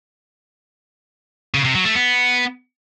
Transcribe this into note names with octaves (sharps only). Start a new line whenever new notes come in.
C#3
C3
F#3
A3
B3